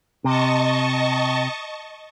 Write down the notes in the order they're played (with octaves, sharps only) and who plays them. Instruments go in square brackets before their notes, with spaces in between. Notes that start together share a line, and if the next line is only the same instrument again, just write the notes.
[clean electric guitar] C3 [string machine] D#5 A5 C#6